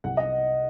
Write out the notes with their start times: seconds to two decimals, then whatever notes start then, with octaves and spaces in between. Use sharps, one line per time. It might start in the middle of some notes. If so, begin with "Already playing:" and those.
0.04 C2 F#5
0.17 D#5